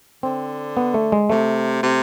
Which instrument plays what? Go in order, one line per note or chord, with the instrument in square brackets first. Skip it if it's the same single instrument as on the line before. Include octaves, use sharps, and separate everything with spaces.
[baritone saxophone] D3 [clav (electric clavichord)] C4
[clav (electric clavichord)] B3
A3
G#3
[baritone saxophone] C3 [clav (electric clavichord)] A3
[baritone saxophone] C3